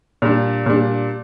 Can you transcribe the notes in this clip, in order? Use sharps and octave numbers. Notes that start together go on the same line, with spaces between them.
A#2 G3 D4
A#2 G3 D4